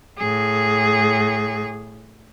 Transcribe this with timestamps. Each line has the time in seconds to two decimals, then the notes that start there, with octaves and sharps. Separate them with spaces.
0.18 A2 G#4